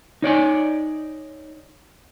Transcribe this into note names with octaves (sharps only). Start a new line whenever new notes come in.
D#4 C#5 D5 G#5